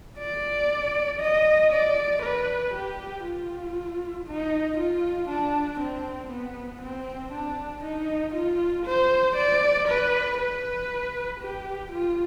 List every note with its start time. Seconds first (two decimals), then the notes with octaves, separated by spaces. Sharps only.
0.18 D5
1.20 D#5
1.72 D5
2.22 B4
2.74 G4
3.24 F4
4.27 D#4
4.78 F4
5.29 D4
5.80 C4
6.31 B3
6.82 C4
7.32 D4
7.84 D#4
8.34 F4
8.86 C5
9.36 D5
9.88 B4
10.39 B4
11.40 G4
11.92 F4